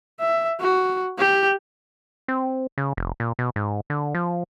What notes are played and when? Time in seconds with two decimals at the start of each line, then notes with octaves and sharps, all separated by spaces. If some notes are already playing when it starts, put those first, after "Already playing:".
0.20 E5
0.61 F#4
1.18 G4
2.28 C4
2.78 C#3
2.97 F1
3.20 A#2
3.39 B2
3.56 G#2
3.90 D3
4.15 F3